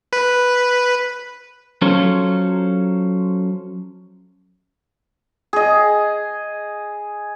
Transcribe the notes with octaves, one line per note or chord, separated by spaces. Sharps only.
B4
F#3 C#4 F4 A4 C5
G#4 D#5